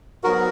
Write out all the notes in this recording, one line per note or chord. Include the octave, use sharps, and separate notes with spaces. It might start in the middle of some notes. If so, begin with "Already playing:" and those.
G#2 F#3 B3 F#4 A#4